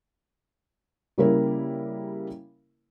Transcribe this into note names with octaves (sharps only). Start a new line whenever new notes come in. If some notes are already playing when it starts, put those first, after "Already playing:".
C#3 G3 A#3 E4 A#4